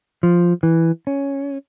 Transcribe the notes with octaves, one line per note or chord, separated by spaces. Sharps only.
F3
E3
C#4